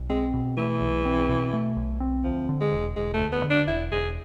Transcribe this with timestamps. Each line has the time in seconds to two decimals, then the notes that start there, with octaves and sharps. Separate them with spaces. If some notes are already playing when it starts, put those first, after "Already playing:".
Already playing: B1
0.09 G#3 C4
0.33 B2
0.57 E3 A3
0.81 B1
1.05 C4
1.29 B2
1.53 A3
1.77 B1
2.00 C4
2.24 D2 F3
2.49 D3
2.61 G#3
2.72 E1
2.96 E1 G#3
3.14 A3
3.20 D2
3.32 B3
3.44 D3
3.50 D4
3.67 E1 E4
3.91 E1 G#4